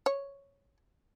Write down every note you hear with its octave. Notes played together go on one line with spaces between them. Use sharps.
C#5